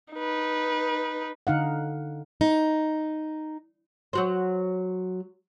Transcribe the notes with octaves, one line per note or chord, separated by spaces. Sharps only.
D#4 B4
D3 D#4 F5 F#5
D#4
F#3 F#4 C5